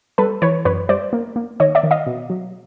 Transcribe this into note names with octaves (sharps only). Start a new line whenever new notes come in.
G3 A4 B4
E3 B4 C#5
F#2 B4 C#5
G3 C5 D5
A#3
A#3
D#3 C#5 D#5
D5 E5
D#3
D#5 F5
B2
F#3